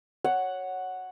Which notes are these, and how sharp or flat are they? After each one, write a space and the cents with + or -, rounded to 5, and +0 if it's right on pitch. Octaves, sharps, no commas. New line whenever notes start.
C#5 +0 F#5 +0